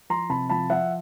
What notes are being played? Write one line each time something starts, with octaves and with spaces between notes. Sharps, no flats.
F3 A#5 C6
C3 A5 B5
F3 A5 B5
F3 E5 F#5